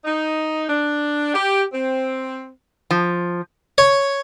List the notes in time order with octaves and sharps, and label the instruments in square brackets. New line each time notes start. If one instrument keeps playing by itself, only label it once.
[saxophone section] D#4
D4
G4
C4
[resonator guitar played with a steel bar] F3
[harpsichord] C#5